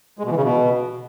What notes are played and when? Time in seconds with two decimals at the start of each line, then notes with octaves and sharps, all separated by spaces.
0.19 G#3
0.25 B2
0.31 E3
0.37 C#3
0.43 B2